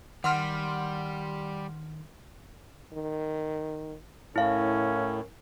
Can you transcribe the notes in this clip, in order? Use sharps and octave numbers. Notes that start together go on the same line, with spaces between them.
D#3 G3 F#5 C6 F6
D#3
A2 C#4 E4 A#4 F5